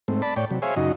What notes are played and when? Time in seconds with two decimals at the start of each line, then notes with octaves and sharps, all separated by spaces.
0.08 G#2 A3 C4
0.22 D5 A5 B5
0.36 A2 C#5 D5 G5
0.51 C3 F#3
0.62 G#4 C5 C#5 E5 F5 G#5
0.76 F#2 C#3 D#4 F#4 D#5